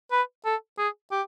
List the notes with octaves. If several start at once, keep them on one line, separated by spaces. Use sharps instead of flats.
B4
A4
G#4
G4